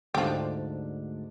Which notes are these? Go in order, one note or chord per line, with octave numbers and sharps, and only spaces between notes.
D2 G#2 F3 D4 G4